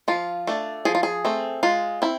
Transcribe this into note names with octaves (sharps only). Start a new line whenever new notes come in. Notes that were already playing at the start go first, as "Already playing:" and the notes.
F3 F4
A3 D4
F3 G#4
F4
G#4
A3 C4
G#3 F4
C4 E4